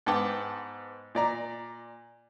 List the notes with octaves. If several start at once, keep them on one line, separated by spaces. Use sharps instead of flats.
G#2 B3 F#5 G5 A5 D6
A#2 D5 A#5